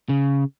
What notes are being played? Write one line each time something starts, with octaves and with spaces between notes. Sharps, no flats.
C#3